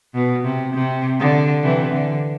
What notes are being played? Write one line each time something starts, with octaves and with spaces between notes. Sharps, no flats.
B2
C3
C3
D3
C3 E3
D3